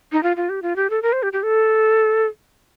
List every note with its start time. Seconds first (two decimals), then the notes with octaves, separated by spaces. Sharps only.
0.12 D#4
0.23 F4
0.37 F4
0.49 G4
0.62 F4
0.76 G4
0.90 A4
1.02 A#4
1.13 C5
1.23 G4
1.33 G4
1.43 A4